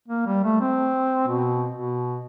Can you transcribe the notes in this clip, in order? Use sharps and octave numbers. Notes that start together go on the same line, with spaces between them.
A#3
G3
A3
C4
B2
B2